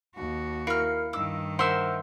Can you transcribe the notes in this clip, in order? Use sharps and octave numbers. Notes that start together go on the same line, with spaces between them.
D#2 F#4
E4 A#4 F5 F6 C#7
G2 D#3 D6 E6
A#4 C5 E5 F#5 C6 E6